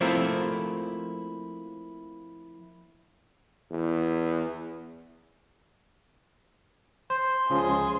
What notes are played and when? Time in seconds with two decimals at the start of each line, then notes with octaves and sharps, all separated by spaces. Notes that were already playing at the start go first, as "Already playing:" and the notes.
0.01 F3 A3 A#3 C4 E4
3.71 E2
7.10 C5 C6
7.50 C#2 C#3 F3 G#4